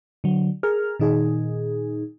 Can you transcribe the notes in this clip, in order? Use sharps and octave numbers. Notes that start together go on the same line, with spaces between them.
D3 F#3
G#4 A#4 F6
A#2 D#3 D#4 G#4